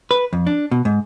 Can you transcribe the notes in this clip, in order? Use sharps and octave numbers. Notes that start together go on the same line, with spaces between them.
B4
F2
D4
B2
G#2